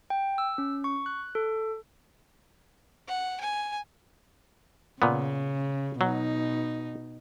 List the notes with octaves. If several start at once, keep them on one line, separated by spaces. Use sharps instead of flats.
G5
E6
C#4
C#6
F#6
A4
F#5
G#5
A#2 C#3 B3
B2 F#3 D#4